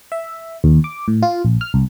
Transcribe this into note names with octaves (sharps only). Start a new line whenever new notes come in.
E5
D#2
D6
A2
F4
A#1
F6
C2